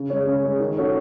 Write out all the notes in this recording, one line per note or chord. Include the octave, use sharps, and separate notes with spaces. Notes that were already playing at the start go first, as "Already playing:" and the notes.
Already playing: C#3
G#3 C#4
C#3
G#3 C#4
D#3
A3 C#4 F#4